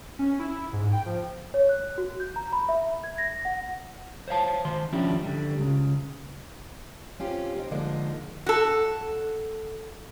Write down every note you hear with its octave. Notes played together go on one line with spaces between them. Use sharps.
C#4
E4
G#2
G5
F3
C#5
F#6
F#4
G6
A#5
B5
E5
G#6
A#6
F#5
C5 C#5 F5 A5
D#3 C5 C6
F3 C#4 D4 E4 G4
D3 G3
C#2 C#3
C4 C#4 F4 G4
C4 D#4
D3 F3 G#3 A#3 D#4
F#4 A4